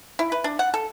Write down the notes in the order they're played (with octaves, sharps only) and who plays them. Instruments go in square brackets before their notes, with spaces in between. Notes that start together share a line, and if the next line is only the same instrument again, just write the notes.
[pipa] E4
B4
D4
F#5
A4